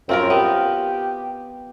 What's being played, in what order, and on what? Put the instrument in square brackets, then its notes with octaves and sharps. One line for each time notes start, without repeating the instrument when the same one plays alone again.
[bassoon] F#2 [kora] C4 F4 A#4
[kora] B3 [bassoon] G4